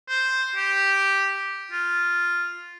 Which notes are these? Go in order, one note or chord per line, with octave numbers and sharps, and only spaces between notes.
C5
G4
F4